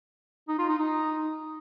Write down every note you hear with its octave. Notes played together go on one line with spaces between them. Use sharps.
D#4
F4
D#4
D#4